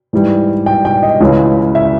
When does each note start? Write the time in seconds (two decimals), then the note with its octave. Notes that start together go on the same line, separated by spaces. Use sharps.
0.13 G#2 E3 G3
0.66 G5
0.85 G5
1.03 D#5
1.20 C#2 C#3 E3 G#3
1.75 E5